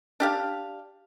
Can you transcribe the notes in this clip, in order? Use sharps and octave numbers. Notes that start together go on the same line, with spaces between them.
D4 G4 F5